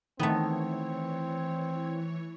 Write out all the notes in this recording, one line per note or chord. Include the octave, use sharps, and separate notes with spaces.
D#3 E3 A3 B3 C4 C#5